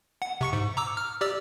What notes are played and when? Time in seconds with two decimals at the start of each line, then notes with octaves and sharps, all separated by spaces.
0.22 F#5
0.41 C3 C#6 C#7
0.53 G#2
0.77 A#5 D6 E6
0.97 F6
1.21 G4 D5 E6